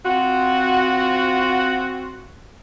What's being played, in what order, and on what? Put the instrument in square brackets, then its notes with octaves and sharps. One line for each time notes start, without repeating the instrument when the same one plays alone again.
[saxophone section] C4 F4 F#4